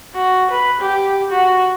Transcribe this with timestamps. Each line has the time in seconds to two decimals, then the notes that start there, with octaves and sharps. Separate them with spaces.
0.15 F#4
0.51 B4
0.81 G4
1.31 F#4